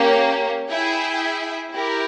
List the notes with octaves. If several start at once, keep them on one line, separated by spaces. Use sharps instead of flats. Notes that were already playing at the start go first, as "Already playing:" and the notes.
Already playing: A#3 C#4 G4
E4 G#4 E5 G5
E4 G4 A#4